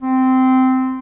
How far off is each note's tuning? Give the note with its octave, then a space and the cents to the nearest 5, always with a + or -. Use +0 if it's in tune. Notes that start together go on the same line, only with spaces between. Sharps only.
C4 -15